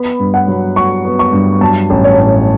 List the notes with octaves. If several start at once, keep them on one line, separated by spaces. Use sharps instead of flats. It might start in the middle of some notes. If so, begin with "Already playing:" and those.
Already playing: B3 B5
G2
F#5
F#3
F#4 C#6
B3
C#6
G2
F#3 A5
A1
C#5
A2